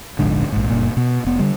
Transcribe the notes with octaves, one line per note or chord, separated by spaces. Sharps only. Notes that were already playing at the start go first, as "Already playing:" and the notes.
D1 A#1 G#2 D3
A#1 G#2
F#1 G2 A#2
B2 B3
F1 B3
D3 G3